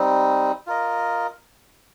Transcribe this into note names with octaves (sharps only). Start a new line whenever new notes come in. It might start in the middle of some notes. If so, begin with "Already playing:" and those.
Already playing: G3 C4 D#4
F4 A#4 D#5